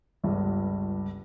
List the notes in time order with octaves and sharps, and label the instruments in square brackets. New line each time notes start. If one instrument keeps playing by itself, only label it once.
[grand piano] G1 C#2 G2